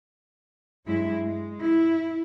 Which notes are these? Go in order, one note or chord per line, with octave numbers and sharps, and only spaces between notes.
G2 F#3 G#3 E4
G#3
E4